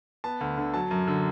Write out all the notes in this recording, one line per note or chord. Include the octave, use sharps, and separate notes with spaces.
B3 A5
D2
D3
F#3 A5
F#2
D3